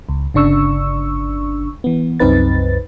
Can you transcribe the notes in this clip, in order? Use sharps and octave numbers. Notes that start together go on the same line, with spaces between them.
C#2
G1 C#3 D4 C#6 E6
E3 B3
C2 F#2 C4 D#4 B4 A6